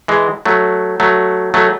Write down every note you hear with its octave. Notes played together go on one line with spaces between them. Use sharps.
E3 G#3
F#3 A3
F#3 A3
F#3 A3